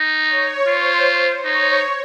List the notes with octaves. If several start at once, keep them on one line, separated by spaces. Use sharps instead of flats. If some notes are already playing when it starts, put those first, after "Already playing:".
Already playing: D#4
C#5
F4 C5
D#4 C#5